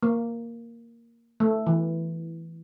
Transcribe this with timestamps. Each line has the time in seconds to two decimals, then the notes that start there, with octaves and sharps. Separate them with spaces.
0.03 A#3
1.40 A3
1.67 E3